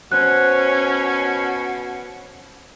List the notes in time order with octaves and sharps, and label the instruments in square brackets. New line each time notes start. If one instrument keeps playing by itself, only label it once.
[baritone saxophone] B2 [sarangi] C#4 [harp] C5 [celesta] F#6